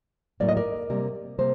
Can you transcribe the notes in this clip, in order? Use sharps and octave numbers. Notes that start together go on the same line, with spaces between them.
A2 F#3 A#3 D5
D#5
A#4 D5
C3 G3 A#3
C3 G3 A#3 C5